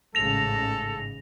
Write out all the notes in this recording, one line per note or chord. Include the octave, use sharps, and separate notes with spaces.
A1 G#2 C#3 A4 A#6 F7